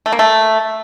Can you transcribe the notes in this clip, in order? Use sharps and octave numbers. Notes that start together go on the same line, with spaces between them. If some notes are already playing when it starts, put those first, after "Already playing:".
A3
A#3
A3